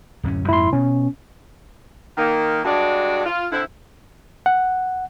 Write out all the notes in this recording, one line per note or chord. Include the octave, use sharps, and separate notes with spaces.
D1 F#2 C#4
F2 G#2 A#3 E4 C6
B2 C#4
D#3 A#3
G2 G#3 D4 F#4 D5
F4
D3 C4 E4
F#5